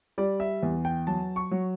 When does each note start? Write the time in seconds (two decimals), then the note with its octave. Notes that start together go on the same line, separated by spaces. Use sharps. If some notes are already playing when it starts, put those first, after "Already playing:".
0.18 G3 D5
0.40 E5
0.63 E2
0.85 G5
1.07 F#3 A5
1.36 C#6
1.51 F#3